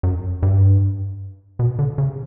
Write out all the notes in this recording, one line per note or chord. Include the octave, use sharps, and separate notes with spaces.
F#2
G2
B2
D3
C#3